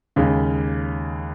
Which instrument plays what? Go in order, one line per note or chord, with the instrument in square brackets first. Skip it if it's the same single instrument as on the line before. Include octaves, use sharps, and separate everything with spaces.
[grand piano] D#2 C#3 G#3